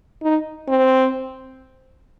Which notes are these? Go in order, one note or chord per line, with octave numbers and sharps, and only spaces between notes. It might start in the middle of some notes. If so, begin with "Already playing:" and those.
D#4
C4